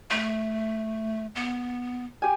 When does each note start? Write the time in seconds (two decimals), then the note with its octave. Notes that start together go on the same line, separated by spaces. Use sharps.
0.10 A3
1.35 B3
2.22 G4 G#5